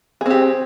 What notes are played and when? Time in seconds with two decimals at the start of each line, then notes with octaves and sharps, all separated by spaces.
0.21 G#4
0.26 C4
0.30 G4